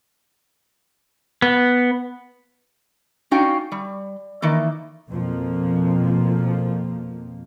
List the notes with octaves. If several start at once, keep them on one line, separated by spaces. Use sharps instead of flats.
B3
C#4 D#4 F#4 D5 F5 G5
G3
D#3 E3 A#3
F2 B2 F3 A#3